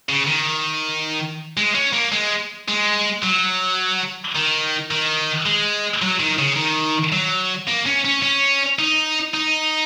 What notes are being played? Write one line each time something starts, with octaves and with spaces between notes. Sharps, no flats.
C#3
D#3
G#3
C#4
A#3
G#3
G#3
F#3
D#3
D#3
G#3
F#3
D#3
C#3
D#3
F#3
A#3
C#4
C#4
C#4
D#4
D#4